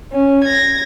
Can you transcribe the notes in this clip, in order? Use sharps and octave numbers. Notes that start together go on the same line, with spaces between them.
C#4
G#6 A#6